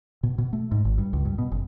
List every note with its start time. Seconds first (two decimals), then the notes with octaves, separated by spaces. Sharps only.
0.23 B2
0.38 B2
0.53 A3
0.71 G#2
0.85 G#1
0.98 G2
1.13 C#2
1.25 G2
1.38 B2
1.52 F#1